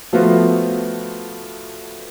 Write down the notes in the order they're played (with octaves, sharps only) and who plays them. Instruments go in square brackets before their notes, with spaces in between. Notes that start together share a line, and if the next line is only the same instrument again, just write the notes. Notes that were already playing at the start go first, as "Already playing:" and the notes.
[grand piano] F3 A3 B3 F4 F#4